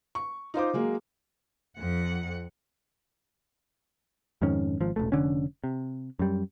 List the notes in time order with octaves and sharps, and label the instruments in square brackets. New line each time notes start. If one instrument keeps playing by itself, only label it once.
[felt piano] C#6
D#4 F4 C5 D6
F#3 G#3 A#3
[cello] F2 F#5
[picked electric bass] F2 G#2 D#3 C#4
G#1 F3
E1 A1 A3
F1 D#2 D3 C#4
C3
F#2 G3